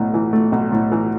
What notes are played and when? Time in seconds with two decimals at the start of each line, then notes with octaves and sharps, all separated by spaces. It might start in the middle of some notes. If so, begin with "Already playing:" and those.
Already playing: B1 A2
0.14 E3
0.33 A3
0.52 B1
0.72 A2
0.92 E3